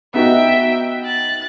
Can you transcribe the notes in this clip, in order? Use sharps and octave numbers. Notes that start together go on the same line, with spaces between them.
B3 D#4 F#4 E5 G5
F#6 A6